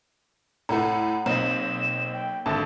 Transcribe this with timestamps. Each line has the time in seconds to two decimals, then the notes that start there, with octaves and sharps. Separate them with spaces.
0.69 A2 A3 F#5 A#5
1.26 B1 A#3 C4 D#5 E7
2.13 G5
2.46 G#1 D3 E5 A5